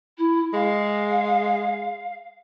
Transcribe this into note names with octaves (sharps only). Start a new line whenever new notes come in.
E4
G#3 F5